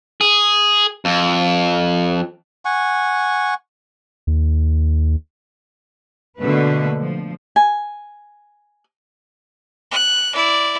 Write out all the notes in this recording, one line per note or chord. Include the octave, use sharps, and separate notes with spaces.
G#4
F2
F#5 G#5 C#6
D#2
B2 D3 A3 A#3 B4
F3
G#5
F#6
E4 D5